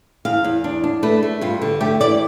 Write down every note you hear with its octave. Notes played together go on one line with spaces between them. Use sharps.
E2 F5
E2
D4
D4
A3 B4
A3
G2 F4
D3
A3 G4
E3 D5